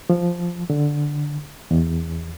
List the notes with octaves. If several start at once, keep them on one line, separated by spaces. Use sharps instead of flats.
F3
D3
E2